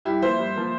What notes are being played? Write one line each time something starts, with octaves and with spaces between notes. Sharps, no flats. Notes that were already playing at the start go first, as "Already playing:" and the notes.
G2 E4 G4
F3 A#3 C5 E5
G2
F3 A#3